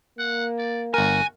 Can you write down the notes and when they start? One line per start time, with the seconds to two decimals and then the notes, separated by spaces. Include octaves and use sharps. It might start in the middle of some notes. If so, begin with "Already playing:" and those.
0.18 A#3 F#5
0.58 D5
0.94 G1 F#4 A#4 G#5